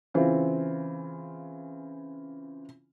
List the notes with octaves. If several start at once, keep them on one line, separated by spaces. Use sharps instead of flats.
C#3 E3 C4 F4